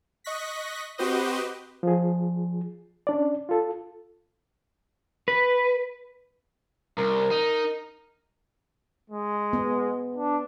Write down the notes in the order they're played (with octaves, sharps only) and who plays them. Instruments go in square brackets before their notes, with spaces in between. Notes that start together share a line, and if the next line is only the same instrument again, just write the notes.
[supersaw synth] D#5 C#6 F#6 A#6 B6
C4 F#4 G4 B4 C5 D#5
[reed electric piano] F3 G#4
C#4 D4 D5
F4 A4
[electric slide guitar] B4
[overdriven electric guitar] C2 [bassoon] A#4
[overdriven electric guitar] D#4
[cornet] G#3
[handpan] B3
[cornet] D4